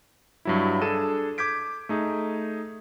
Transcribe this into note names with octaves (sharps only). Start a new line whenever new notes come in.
G2 F#3 E4
D4 G#4 A4 D#7 E7
D6 G6 G#6 B6 D7
A3 D#4 G#4